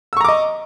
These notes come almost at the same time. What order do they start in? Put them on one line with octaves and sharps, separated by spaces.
E6 C#6 A#5 D6 D#5